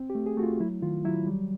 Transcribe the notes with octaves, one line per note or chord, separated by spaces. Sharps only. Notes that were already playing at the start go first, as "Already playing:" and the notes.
Already playing: C4
G4
A3
G#4
A3 F#4
F4
F#3 E4
D#3 F4
F#3 E4
G3